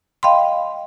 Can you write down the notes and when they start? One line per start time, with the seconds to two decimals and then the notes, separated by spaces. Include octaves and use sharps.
0.23 D#5 F5 G5 B5 C6